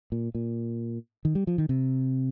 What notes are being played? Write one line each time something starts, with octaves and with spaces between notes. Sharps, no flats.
A#2
A#2
D#3
G3
F3
D#3
C3